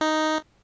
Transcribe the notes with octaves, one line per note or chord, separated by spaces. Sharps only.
D#4